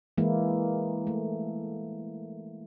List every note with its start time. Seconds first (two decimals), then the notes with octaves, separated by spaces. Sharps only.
0.18 E3 G#3 A#3 E4
1.07 A3